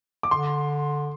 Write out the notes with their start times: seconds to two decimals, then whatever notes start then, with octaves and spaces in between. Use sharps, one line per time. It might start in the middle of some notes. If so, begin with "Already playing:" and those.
0.23 D6
0.31 D3 C6